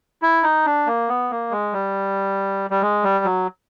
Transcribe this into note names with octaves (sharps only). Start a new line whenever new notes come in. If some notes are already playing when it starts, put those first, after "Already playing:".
E4
D#4
D4
A#3
B3
A#3
G#3
G3
G3
G#3
G3
F#3